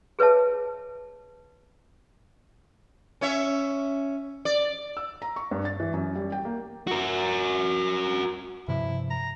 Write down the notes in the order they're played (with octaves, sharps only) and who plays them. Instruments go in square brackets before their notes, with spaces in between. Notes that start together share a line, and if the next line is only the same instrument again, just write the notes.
[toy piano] G#4 B4 C#5 E5 A5
[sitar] C#4 C#5 E5
D5
[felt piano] E6
A#5
C#6
G2
A6
E3
F#2
G3
G5
A#3
[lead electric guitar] F#4 A#4
[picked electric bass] G2 C3 F3 [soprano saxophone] E4
[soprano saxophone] A#5